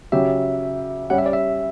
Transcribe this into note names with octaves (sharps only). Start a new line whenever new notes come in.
C#3 F#3 C#4 G4 E5
G3 C#4 G4 F#5
E5
D5
E5